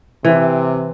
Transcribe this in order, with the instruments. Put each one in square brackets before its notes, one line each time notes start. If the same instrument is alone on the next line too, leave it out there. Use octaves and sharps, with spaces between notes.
[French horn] C3 [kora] E3